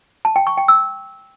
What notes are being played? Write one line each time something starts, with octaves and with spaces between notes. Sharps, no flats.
A5
G5
C#6
G5
E6